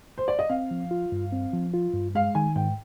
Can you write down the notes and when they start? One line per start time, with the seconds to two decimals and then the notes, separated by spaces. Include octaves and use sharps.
0.18 C5
0.28 D5
0.39 D#5
0.49 C4 F5
0.71 F3
0.91 F4
1.12 G2
1.32 C4
1.53 F3
1.74 F4
1.94 G2
2.15 G#3 F5
2.35 D#3 G#5
2.56 G#2 G5